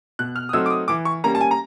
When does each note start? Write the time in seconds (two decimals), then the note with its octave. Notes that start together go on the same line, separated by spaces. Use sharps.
0.19 B2 F#6
0.36 F6
0.49 D#6
0.53 F#3 A3 C4 D#4 E6
0.66 D6
0.70 D#6
0.88 E3 D6
1.05 C#6
1.24 G3 A#3 C#4 A#5
1.35 A5
1.41 G#5
1.51 A#5